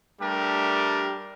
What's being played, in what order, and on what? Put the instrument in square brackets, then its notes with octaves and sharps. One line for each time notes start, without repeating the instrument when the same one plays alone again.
[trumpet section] G3 A3 D4 G4 A#4